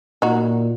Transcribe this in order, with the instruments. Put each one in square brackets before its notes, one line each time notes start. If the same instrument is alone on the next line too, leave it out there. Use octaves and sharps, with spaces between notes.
[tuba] A#2 [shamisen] D#4 F#4